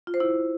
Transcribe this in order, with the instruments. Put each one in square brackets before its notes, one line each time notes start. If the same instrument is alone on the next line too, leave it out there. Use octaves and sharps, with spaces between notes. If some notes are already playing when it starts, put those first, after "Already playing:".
[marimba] F4
C5
E4